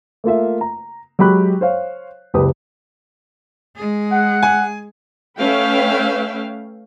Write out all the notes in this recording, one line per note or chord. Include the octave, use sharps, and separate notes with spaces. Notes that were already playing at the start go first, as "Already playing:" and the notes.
A3 A#3 F4 E5
A#5
F#3 G#3 G4 B5 F#6
C5 C#5 F5
F#1 C#2 G4 B4 D#6
G#3 G#4
F#5
G#5
A3 C#4 B4 E5 F5 G5